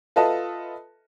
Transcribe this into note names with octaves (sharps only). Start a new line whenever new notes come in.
F4 A4 B4 D#5 E5 A5